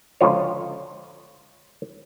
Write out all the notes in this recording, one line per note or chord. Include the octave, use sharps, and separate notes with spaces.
C#2 D3 F3 C#5